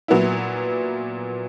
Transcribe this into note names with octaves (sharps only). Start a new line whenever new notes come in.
A#2 F#3 B3 E4